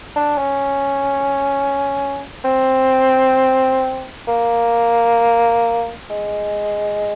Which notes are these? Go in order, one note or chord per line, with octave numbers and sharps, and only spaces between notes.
D4
C#4
C4
A#3
G#3